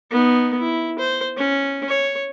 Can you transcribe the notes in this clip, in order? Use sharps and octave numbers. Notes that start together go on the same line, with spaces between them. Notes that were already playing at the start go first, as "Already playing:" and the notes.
B3 D#4
E4
C5
C#4
C#5